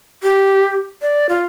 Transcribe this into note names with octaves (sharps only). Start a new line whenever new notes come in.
G4
D5
F4